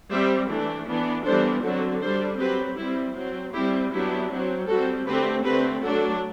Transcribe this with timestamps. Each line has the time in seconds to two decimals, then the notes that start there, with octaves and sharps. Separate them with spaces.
0.10 G3 C4 C5 E5
0.49 E3 A3 D4
0.86 E3 B3 D4
1.25 E3 G3 B3 D4 A4 C5
1.63 D3 F#3 C4 F#4 A4
2.01 G3 D4 A4 C5
2.39 F#3 C4 G4 B4
2.78 G3 C4 E4
3.16 F#3 C4
3.53 G3 C4 E4 G4
3.92 F#3 B3 D4 E4 G4
4.30 F#3 C4
4.68 G3 C4 F#4 A4
5.07 D3 A3 C4 G4 B4
5.44 D3 A3 C4 G4 B4
5.82 F#3 A3 D4 F#4 A4